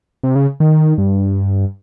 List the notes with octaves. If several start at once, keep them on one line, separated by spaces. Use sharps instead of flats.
C3
C#3
D#3
G2